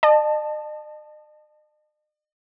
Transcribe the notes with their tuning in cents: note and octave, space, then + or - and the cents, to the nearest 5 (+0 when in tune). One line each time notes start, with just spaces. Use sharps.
D#5 -45 A5 +0